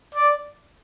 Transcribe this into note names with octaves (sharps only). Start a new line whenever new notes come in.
D5